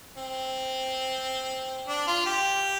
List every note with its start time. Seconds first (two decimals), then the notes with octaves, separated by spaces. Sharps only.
0.17 C4
1.88 D4
2.07 F4
2.26 G4